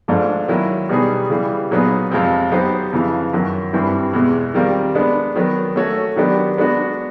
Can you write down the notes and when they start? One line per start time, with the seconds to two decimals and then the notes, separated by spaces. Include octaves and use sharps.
0.08 G#2 F3 A3 D4
0.48 D#3 F#3 A#3 C#4 E4
0.89 B2 G3 B3 D#4 G#4
1.30 C#3 E3 G3
1.71 A#2 F#3 B3 D#4 G#4
2.11 F2 C3 F3 G#3 C4
2.52 F#3 B3 D#4 G4 C5
2.93 F2 C#3 E3
3.33 F#2 D#3 F#3
3.73 G2 E3 G3 C4 E4
4.13 E2 B2 G#3
4.54 D#3 G3 C4 F4 A#4
4.95 G#3 B3 D4
5.36 D#3 F#3 B3
5.76 A3 C#4 F#4 A4 C#5
6.16 D#3 F#3 B3 D4 G4
6.58 G#3 B3 D4 F#4